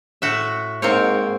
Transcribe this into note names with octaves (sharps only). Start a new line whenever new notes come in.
A2 F#4 E5
G#2 A#3 C4 C#5